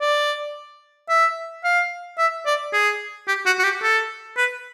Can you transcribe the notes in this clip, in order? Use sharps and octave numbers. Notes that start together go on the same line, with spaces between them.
D5
E5
F5
E5
D5
G#4
G4
F#4
F#4
G4
A4
B4